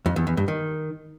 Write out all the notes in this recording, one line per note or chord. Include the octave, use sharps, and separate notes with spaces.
F2
E2
E2
G2
D#3